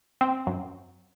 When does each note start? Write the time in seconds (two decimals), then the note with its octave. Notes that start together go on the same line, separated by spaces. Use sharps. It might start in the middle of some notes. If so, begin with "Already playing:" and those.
0.21 C4
0.47 F#2